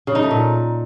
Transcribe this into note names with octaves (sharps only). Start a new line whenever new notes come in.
C#3
D#4
A3
A#2